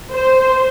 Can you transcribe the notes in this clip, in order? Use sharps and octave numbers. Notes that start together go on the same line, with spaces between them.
C5